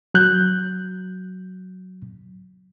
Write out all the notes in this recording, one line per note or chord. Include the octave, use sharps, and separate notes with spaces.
F#3 F#6 G6